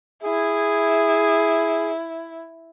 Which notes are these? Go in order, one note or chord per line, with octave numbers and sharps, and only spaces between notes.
E4 G#4